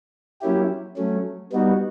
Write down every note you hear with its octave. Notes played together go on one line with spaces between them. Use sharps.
F#3 A#3 C#4 E4 G4
F#3 A3 C#4
G3 B3 D#4 F#4